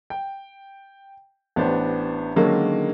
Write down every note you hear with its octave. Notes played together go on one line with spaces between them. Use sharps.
G5
A1 B3 D4 G4 C5
D3 D#3 F#3 G#3 A#3 C#4